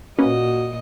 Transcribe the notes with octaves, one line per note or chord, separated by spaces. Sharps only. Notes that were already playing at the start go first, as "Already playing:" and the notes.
A#2 A#3 C#4 F#4 B4 D#5